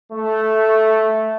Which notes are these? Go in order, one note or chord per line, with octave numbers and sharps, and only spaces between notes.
A3